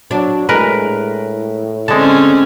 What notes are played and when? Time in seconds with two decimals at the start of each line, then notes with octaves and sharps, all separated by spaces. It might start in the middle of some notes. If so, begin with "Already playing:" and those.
0.11 F#3 D4
0.49 A2 G#3 A#4 B4
1.88 D3 G#3 C4 C#4 A5